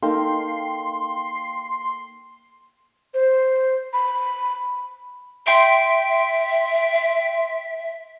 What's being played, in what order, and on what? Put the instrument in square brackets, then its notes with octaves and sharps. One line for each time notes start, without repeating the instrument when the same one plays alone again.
[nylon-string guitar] A#3 D#4 A4 [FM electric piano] F5 G5 [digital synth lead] C6
[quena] C5
B5
[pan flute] E5 [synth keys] G5 C6 D7